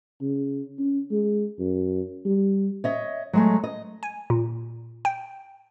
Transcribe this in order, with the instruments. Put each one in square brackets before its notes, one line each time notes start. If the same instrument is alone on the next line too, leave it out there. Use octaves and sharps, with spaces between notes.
[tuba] C#3
C#4
G#3
F#2
G3
[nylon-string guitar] C#5 D#5 E5
F#3 G#3 A3
D#5
[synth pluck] G#5
A#2
G5